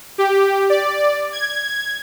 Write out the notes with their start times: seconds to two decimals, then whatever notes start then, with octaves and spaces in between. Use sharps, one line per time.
0.18 G4
0.70 D5
1.33 G#6